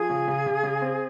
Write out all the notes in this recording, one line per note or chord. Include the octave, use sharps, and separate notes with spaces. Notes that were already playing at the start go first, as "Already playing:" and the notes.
Already playing: F3 G#4
C#3
C#3
C#3
C#3
C4